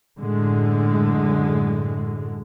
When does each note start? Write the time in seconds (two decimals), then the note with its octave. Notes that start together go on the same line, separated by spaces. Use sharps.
0.18 F#2 A2 D3 G#3